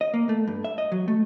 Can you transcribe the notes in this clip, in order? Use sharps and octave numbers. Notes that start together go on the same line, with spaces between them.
D#5
A#3
A3
G2
E5
D#5
F#3
A3